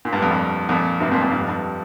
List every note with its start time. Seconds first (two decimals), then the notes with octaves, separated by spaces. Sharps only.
0.05 A#2
0.13 G2
0.22 F2
0.31 G2
0.69 F2 A#2
1.00 G2 C3
1.11 F2 A#2
1.22 A#2
1.31 G2
1.40 F2
1.48 G2